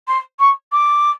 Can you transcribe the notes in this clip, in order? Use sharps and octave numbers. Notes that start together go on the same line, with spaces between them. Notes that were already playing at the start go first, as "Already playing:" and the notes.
C6
C#6
D6